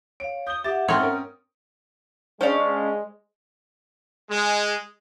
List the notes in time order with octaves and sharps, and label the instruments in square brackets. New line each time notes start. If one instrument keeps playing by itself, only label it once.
[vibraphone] C#5 F5 [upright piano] D7
[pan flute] D#6 [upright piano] G6 G7
[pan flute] G4 [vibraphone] E5 F#5 [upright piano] D6 A6
[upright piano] G#2 A4 D#6 [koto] C4 C#5 [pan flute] F6
[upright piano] C#4 A#4
[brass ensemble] G#3 [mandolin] C#4 D4 F5 [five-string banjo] C5 D5
[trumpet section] G#3